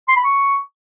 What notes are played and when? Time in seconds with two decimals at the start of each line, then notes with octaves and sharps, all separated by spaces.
0.08 C6
0.16 B5
0.24 C#6